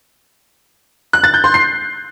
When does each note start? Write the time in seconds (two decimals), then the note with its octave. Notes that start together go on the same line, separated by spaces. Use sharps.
1.13 F#6
1.24 A6
1.34 G6
1.44 C6
1.54 C7